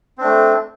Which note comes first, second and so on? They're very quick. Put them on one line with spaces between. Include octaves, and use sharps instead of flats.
C4 D4 A3